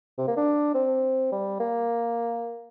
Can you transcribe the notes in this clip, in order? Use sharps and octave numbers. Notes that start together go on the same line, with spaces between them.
C3
A#3
D4
C4
G3
A#3